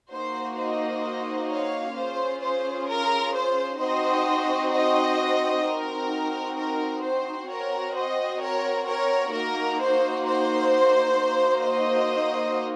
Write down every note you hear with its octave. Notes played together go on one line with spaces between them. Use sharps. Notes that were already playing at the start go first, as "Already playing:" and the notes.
A#3 D#4 F#4 C5
C5 D#5
C#5 F5
C#4 F4 G#4 C5
C5
A#4
C5
C4 D#4 F#4 C5 D#5
C5 D#5
C4 D#4 F#4 A#4
A#4
C5
C4 F#4 A#4 C#5
C5 D#5
A#4 C#5
A#4 C#5
A#3 D#4 F#4 A#4
C5
C5
A#3 D#4 F#4
C5 D#5